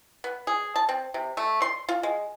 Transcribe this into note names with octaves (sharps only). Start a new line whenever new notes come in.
B3
G#4
A5
C4
C3
A3
C6
F4
G#3